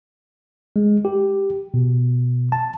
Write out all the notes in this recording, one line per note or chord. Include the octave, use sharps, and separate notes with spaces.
G#3
G4
B2
A5